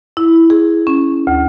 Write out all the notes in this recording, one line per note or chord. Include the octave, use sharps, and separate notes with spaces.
E4
G#4
C#4
D2